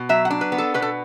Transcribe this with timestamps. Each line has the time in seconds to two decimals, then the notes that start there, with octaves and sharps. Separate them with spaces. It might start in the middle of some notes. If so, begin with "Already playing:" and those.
Already playing: B2
0.09 F#3 E5
0.25 F#5
0.30 D4
0.41 B4
0.52 B3
0.58 A4
0.74 B2 B4
0.82 A4